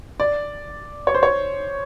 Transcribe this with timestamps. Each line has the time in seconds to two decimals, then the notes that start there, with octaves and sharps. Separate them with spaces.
0.20 D5
1.07 C#5
1.14 C5
1.23 C#5